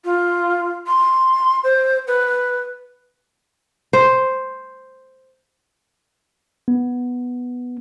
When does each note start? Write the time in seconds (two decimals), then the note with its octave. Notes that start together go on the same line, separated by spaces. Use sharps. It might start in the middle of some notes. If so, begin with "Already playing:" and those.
0.05 F4
0.87 C6
1.64 C5
2.07 B4
3.93 C5
6.68 B3